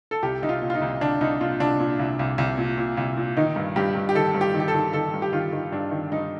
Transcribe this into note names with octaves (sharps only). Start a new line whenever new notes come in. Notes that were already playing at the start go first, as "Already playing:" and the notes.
A4
C2 G4
C2 D#4
F4
A#2
F4
D#4
C2
C2 D4
C2 D#4
A#2 F4
C2 D4
A#2
C2
C2
C2
A#2
A#2
C2
A#2
D#3 D#4
G2
G2 G4
G2
G4
D#3 A4
G2
G4
D#3
G4
A4
D#3
D#3 A4
G2
G4
D#3 F4
D#3
G2 D4
D#3
G2 D#4